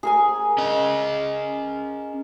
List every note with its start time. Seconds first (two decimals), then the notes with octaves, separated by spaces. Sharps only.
0.03 G#4 A#4 G#5
0.58 C#4 D#5